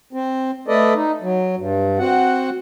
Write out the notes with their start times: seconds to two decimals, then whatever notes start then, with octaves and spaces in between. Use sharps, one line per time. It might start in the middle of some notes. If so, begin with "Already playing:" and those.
0.13 C4
0.68 A3 A4 B4 D5 D#5
0.95 D#4
1.22 F#3
1.58 G2
1.99 C4 F#4 F#5